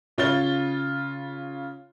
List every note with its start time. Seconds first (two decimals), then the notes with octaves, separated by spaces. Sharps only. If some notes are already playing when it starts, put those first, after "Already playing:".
0.18 C#3 F4 C#5 A6 G7